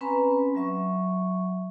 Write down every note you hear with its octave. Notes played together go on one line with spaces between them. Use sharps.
C4 C#4 B4 G#5 A#5 B5
F#3 E5 C#6